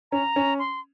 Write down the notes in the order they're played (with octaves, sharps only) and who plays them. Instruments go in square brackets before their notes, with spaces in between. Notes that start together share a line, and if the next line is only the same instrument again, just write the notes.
[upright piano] C#4 [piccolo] A#5
[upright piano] C#4
[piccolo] C6